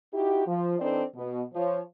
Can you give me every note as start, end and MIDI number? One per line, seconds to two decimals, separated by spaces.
0.14 0.46 63
0.14 0.46 64
0.14 0.46 66
0.14 0.46 67
0.46 0.78 53
0.79 1.02 52
0.79 1.02 60
0.79 1.02 62
0.79 1.02 63
0.79 1.02 69
0.79 1.02 74
1.16 1.41 47
1.54 1.80 53
1.54 1.80 73